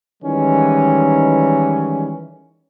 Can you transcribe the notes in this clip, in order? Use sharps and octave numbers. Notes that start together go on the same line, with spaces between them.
D#3 E3 G3 G#3 C#4